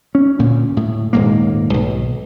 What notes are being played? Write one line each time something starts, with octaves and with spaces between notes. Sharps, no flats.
C#4
D2 A#2
A2
D#1 G#2 A#3
B1